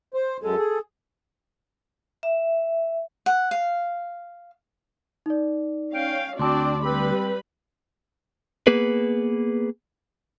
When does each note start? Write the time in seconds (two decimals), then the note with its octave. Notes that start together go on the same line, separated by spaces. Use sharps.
0.14 C5
0.42 F#2 G#3 A4
0.58 G#4
2.23 E5
3.26 F#5
3.51 F5
5.26 D#4 D5
5.94 C#4 F5 G5
6.39 D2 C4 D4 F#4 D5 A5 C6 D6
6.85 G3 C4 B4 B5
8.67 A#3 B3 G#4 B4